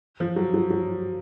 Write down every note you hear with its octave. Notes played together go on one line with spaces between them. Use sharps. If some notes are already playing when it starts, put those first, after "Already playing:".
F3
F#3
F#3
F#3